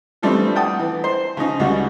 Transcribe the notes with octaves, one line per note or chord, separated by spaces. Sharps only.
E3 F3 G3 A3 C4 D4
F#5 G5 A5 D#6
E3
C5
C#3 F3 D#4
C#2 C#3 G3 F#4